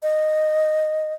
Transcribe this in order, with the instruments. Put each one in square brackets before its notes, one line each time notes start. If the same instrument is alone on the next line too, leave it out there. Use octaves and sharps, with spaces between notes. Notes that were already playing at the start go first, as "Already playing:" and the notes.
[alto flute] D#5